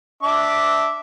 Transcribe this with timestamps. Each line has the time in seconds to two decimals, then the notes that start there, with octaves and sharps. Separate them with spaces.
0.23 D4 E5 D6